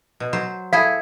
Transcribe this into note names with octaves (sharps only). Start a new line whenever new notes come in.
B2
F#3 C5
E4 G#4 A4 F5